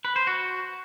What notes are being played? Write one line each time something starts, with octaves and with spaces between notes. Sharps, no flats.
B4
C5
F#4